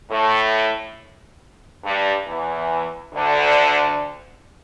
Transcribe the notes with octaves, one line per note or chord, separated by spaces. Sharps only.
A2 A3
G2 G3
E2 E3
D2 D3